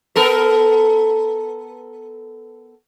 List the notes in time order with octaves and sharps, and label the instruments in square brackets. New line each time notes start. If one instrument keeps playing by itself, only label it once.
[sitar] B3 A4 A#4